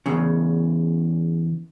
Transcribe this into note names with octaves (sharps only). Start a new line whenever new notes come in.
E2 C#3